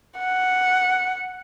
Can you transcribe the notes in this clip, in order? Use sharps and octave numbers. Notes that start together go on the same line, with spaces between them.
F#5